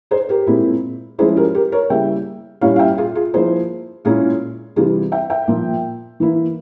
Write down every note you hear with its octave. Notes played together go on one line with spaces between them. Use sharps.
G#4 C5
G4 A#4
A#2 G#3 C4 E4
F3 G#3 C#4 E4 G#4 C5
G4 A#4
G4 A#4
A#4 C#5
C#3 G3 A#3 E4 E5 G5
A#2 G3 C#4 E4 C#5 F5
F5
E5 G5
F4 G#4
F4 G#4
F3 A#3 E4 G#4 C5
A#2 G#3 C#4 E4 F4 G#4
C3 E3 G3 F4 G#4
E5 G5
E5 G5
A#2 F3 A#3
E3 A#3 E4